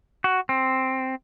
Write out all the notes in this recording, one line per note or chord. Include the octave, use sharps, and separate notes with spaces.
F#4
C4